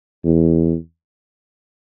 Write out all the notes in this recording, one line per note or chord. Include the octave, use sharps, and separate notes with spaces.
E2